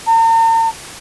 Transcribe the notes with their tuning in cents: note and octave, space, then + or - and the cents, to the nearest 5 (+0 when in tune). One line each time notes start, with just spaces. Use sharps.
A#5 -45